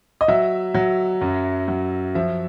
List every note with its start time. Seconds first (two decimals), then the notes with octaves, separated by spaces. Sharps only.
0.21 D#5
0.28 F#3 E5
0.74 F#3
1.21 F#2
1.68 F#3
2.15 F3 E5